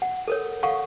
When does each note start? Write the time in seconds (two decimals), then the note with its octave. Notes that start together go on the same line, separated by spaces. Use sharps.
0.02 F#5
0.28 A4 A#4 C#5
0.63 A4 F5 F#5 C#6